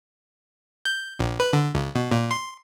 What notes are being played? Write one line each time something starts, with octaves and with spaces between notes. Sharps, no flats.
G6
A#1
B4
D3
C#2
B2
A#2
C6